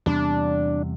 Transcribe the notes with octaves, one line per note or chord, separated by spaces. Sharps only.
E2 C3 G3 D4